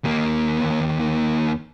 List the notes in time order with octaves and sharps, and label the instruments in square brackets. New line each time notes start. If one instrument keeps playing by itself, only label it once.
[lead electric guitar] D#2 A#3